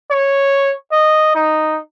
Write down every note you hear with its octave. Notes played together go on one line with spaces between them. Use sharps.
C#5
D#5
D#4